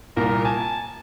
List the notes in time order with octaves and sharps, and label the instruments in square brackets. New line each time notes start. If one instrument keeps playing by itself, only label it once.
[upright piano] C2 A#2 [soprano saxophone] A#4
[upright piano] G#5 [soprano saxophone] A5